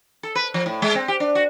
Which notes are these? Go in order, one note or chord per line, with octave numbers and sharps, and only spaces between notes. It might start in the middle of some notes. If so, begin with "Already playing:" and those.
A4
B4
F3
A2
G#3
C4
G4
D4
F#4